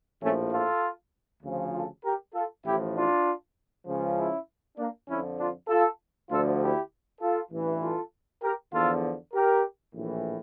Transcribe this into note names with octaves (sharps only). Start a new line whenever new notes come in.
A#1 A2 F3 A3 C#4
F4 A4
D2 C#3 F3
F4 A4
G4 A#4
F4 A4
A1 A2 F3 E4 G4
D4 F4
C#2 C#3 F3
C#4 E4
A#3 D4
F2 D3 F3 C#4 E4
D4 F4
F4 A4
D2 D3 F3 F4 A4
E4 G4
F4 A4
A1 G2 E3
F4 A4
G4 A#4
E2 D3 F3 F4 A4
G4 A#4
A#1 A2 E3